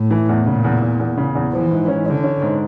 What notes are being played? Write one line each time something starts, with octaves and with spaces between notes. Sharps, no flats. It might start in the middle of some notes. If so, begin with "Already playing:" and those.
Already playing: A2
E3
E2
A#2 C#3
E2
E2
E2
C#3
E2
E3 F3
G#2
C#4
D3 C#4
C#4
G#2